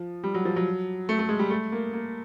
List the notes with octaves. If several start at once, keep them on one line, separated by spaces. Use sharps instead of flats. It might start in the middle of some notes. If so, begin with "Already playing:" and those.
Already playing: F3
G3
F#3
F3
F#3
A3
A3
G#3
G3
A3
A#3
A#3